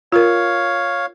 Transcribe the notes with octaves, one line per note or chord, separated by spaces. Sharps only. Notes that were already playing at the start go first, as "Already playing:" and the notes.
F4 A#4 C#5 F5